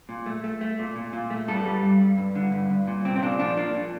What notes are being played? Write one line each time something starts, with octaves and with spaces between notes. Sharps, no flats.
A#2
A3
A3
A3
A#2
A#2
A#2
A3
G2 A4
G3
G2
G2
G2
D3
G2
G2
A#2
C2 C4
C4
A#2 D4
F3 D4
A#3 D4
A#2